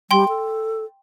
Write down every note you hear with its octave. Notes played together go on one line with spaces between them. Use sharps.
G3 G5 C6
A4